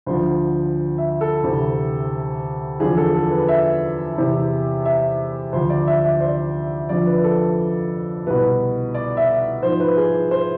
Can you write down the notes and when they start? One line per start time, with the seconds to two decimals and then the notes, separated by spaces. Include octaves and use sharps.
0.06 D2 D3 F3 C5
0.98 E5
1.21 A4
1.43 D2 C3 E3
2.80 E2 D3 F3 G#4
2.97 A4
3.14 A4
3.31 B4
3.48 E5
4.16 E2 C3 E3
4.85 E5
5.53 D2 D3 F3 C5
5.70 D5
5.87 E5
6.04 E5
6.12 D5
6.20 C5
6.28 D5
6.89 F2 D3 F3 D5
7.07 B4
7.24 A4
8.26 C2 B2 B4
8.94 D5
9.17 E5
9.63 G#2 F3 C5
9.80 B4
9.97 G#4
10.31 C5